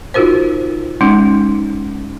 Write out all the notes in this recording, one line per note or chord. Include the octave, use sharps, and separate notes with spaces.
D#4 F4 F#4 A#4 C5
G#3 C#4 D#4